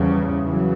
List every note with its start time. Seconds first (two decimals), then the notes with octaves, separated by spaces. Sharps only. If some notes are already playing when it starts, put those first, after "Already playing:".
Already playing: E2 C#3 F3 G3
0.45 C#3 E3 F#3